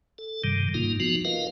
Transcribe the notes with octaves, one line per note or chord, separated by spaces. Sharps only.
A4
G2 C3 D#3 G3
G#2 A#3 D#4 F4
F3 B3 D#4 F#4
F4 A#4 B4 D#5 F5